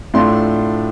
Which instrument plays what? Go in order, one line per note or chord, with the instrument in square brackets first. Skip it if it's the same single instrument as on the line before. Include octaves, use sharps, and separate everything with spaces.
[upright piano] A2 A3 D4 F4 C6